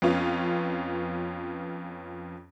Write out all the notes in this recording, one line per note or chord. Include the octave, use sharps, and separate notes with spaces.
F2 B3 C#4 F4